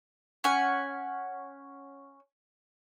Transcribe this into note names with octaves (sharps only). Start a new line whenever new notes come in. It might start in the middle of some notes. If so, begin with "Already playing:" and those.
C#4 F#5 G#5